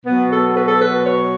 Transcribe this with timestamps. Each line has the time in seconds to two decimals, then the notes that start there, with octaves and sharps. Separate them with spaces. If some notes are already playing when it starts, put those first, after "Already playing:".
0.06 B2 F#3 B3
0.31 A4
0.55 B4
0.68 A4
0.80 B4
1.04 C#5